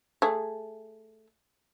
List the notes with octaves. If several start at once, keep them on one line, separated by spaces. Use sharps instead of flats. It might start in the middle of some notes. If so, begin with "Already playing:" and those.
A3 G#4